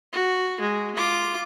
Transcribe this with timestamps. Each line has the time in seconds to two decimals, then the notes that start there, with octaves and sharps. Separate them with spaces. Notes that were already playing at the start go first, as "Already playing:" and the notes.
0.13 F#4
0.61 G#3
0.96 F4 D6